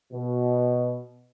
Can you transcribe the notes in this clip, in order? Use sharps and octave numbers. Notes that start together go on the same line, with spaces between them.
B2